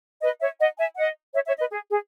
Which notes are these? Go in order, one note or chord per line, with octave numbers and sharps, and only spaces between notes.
B4 D#5
C#5 E5
D#5 F#5
E5 G#5
D#5 F#5
C#5 E5
C#5 E5
B4 D#5
G#4
G#4